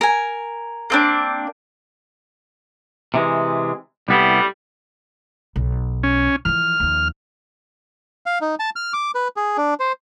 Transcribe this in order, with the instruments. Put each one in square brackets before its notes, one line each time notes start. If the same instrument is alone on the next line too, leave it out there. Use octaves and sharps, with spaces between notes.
[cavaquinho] A#4 G#5
[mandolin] A#3 C4 D4
[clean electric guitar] C3 E3 G#3
[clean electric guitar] C2 B3 E4 [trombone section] A2 G3
[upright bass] B1
[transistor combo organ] C#4
[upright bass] E3 F3 [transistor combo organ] F6
[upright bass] D#2 F3
[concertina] F5
D#4
A5
F6
D6
B4
G#4
D4
C5